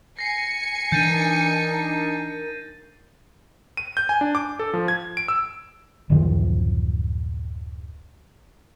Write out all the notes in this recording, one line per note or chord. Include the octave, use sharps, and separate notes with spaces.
G#5 A#6 C7 C#7
E3 D4 D#4 A#4 G6 A6 D#7
D#7
G6
G#5
D4
D6
A4
F3
G#6
D7
E6
D1 F#2 D#3 F3